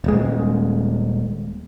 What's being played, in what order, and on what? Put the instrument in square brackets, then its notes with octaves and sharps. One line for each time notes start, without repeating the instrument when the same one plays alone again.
[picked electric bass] D#1 G#3